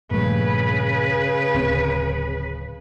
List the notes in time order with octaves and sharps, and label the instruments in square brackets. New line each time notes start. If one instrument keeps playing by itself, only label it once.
[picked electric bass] A#1 G2 A3 [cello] C#3 B4
[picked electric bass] D1 C4